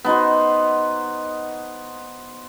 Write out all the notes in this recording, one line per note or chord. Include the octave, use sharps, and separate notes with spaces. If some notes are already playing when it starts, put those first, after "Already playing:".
B3 D#4 F#4 C5